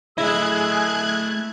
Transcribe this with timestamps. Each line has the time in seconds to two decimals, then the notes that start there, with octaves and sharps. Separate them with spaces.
0.18 A3 E4 G#4 D#5 E6 F#6 G#6